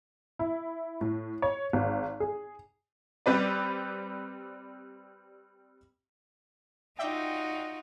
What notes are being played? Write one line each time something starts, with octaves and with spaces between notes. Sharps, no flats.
E4
A2
C#5
G#1
G#4
G3 C4 B4 D5
D#4 F4 F#4 D5 E5 G5